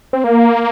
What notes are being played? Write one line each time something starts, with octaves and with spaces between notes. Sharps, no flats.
C4
A#3